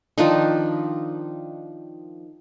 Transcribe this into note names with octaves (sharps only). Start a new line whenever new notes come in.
D#3 F3 D4 D#4